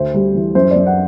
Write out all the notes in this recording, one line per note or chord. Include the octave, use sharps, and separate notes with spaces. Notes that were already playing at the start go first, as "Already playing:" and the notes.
Already playing: D2 C5
G3
E3
F#2 C5
D5
F#2
F#5